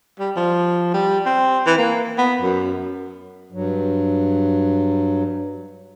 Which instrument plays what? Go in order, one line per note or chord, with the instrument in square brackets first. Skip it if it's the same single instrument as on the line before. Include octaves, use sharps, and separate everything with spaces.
[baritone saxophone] G3
F3
G3
C4
E3
A#3
B3
F#2
[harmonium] G2 F#3